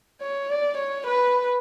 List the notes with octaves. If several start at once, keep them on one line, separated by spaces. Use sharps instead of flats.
C#5
D5
C#5
B4